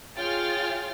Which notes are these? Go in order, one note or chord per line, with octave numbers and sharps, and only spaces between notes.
F4 G#4 C#5 G5 F6 A6